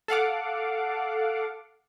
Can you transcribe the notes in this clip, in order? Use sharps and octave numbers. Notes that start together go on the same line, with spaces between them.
A4 F5 F#5 D6